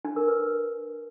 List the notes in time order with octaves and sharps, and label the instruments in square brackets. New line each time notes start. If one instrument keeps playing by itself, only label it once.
[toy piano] D4
A#4
B4